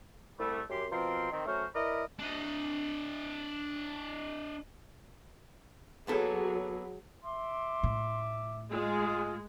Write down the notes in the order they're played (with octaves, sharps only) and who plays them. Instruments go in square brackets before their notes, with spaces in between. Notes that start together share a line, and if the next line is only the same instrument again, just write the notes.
[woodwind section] C2 G3 A3
F#2 G4 C6
B2 F3 C4 A#4 C6
D#3 C4
F#3 A3 C#4 F#4 A#4 C5
E4 A#4 B4 D5 D#5
[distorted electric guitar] D4 D#5
[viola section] F#3 G#4 [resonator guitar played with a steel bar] A#3 B3 A4
[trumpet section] E5 D6 [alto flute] C6
[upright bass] A2
[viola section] G#3 [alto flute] F4 [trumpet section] G#4